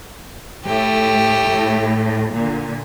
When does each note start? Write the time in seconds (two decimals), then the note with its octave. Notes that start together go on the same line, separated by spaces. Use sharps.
0.65 A2 A3 G4
1.50 A2
2.34 A#2 D3